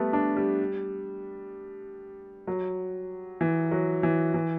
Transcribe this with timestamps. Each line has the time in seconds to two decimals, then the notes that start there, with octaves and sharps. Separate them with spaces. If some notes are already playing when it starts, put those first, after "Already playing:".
Already playing: G3 A3 B3
0.13 D4
0.37 G3
2.47 F#3
3.41 E3
3.71 F#3
4.03 E3
4.34 E3